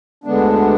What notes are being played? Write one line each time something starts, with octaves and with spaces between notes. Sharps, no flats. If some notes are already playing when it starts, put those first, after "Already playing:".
D2 D3 G#3 B3 D4